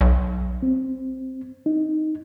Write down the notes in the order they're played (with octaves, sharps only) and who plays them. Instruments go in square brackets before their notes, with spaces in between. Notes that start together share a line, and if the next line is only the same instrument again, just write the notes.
[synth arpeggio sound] B1
[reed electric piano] C4
D#4